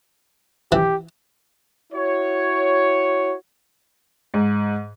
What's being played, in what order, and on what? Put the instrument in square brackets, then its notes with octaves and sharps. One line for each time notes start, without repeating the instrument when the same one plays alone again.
[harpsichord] E3 [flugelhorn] G4
[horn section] E4 F#4 C#5
[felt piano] G#2